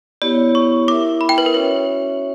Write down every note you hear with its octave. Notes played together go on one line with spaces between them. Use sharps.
B3 E4 G4 C#5 D5
C#6
E4 A#4 E5 D6
B5
G5
B4
A#4
C#4 F#4 B4 C#5 E5